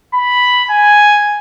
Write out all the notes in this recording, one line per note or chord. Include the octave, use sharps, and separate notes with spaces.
B5
G#5